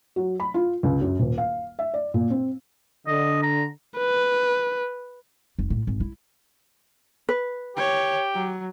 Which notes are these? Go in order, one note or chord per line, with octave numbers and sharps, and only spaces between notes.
F#3
B5
F4
C#2
F#2
D#1
F5
E5
D5
A#2
C4
D3 D#5
A#5
B4
F1
A2
G#1
E4
B4
G4 C#5
F#3